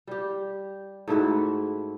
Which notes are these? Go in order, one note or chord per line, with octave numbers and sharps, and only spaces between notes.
G3 G4
G#2 A3 E4 F#4